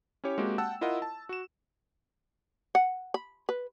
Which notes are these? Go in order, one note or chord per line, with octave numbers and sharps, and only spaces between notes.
C#4 E4 G4 C#5
G#3 A#3 C4 F#4 G4
F#5 G5 A5 E6
E4 F4 A#4 D#5 F#5
A5
F#4 E7
F#5
B5
B4